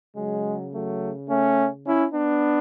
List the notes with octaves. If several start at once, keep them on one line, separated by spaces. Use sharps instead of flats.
C#3 F#3 G#3
F#3 A3
A3 C#4
C#4 E4
B3 D4